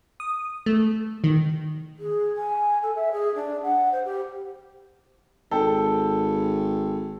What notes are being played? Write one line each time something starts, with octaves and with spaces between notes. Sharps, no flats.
D#6
A3
D#3
G#4
G#5
A4
E5
G#4
D4
F#5
C5
G4
G#1 A4 G5